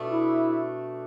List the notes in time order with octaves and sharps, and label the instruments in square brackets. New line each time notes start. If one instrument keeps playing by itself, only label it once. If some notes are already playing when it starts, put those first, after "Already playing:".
Already playing: [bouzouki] B2 A3 D4
[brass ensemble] E4